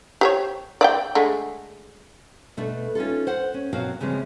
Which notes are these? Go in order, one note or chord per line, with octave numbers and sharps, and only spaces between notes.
G4 C5 C#5
D5 E5 G5
D3 G#3 A3
B2 A3 D4 A4
C#4 D#4 F4 A4
C5 F#5
C#4
B2 F#3 C4 F#4 A#4 F5
C#3 E3 F3 G#3 C4